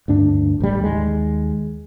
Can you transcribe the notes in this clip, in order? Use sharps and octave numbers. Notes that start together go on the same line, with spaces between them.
D2 G2 D4
A1 G3
D#2 G#3